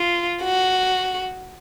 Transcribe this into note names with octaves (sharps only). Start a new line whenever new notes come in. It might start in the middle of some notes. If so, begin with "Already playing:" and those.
Already playing: F4
F#4